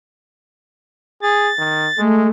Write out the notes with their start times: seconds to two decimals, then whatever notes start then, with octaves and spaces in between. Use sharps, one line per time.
1.22 G#4 A6
1.58 D#3
1.98 G#3 A3